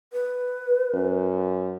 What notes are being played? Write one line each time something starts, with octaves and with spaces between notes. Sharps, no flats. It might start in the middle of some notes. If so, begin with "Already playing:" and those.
B4
F#2